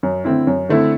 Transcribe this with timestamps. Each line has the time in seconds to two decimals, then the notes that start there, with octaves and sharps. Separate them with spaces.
0.03 F#2
0.24 D3 A3 C4 E4
0.47 F#2
0.69 D3 A3 C4 E4